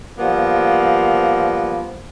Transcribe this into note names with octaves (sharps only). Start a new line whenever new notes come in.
F3 G3 A#3 B3